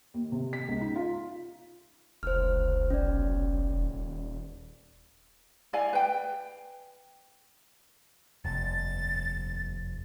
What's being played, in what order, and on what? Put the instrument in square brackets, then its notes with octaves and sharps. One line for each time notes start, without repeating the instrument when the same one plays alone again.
[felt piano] D#2
C3
B6
C#2
D#4
F4
[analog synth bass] F1 [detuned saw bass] C#2 [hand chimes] C5 F6
[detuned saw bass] B1 [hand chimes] C#4 D5
[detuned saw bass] D#1
[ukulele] E4 D5 F5 G#5
B4 G5
[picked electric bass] F1 [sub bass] D#2 [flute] A6